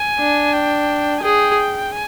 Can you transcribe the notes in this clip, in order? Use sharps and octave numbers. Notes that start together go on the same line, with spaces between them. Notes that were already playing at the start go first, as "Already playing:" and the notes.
Already playing: G#5
D4
G5
G#5
G#4 G5
G#5